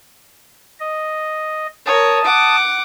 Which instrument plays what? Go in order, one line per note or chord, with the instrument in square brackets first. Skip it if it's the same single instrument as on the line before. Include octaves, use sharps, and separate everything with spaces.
[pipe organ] D#5
[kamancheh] A#4 C#5 [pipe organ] A5 D#6
[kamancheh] F#5 D6